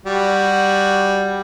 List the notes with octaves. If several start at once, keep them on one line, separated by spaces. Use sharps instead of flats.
G3 F#4